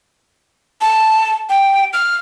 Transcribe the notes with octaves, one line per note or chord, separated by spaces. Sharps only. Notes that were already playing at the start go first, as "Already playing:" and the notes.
A5
G5
F6